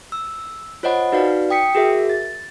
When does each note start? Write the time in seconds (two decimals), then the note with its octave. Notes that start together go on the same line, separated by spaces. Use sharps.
0.12 E6
0.83 F4 C5 C#5 D#5 F#5 B5
1.12 D#4 F#4 B4 D5 F5
1.50 G5 D#6 B6 C#7
1.75 F#4 G#4 A#4 E5
2.10 A6